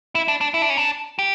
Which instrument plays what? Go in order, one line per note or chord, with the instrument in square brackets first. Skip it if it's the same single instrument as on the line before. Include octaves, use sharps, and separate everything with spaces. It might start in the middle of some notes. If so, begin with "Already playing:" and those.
[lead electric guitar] E4
D4
D4
E4
D4
C#4
D4
G4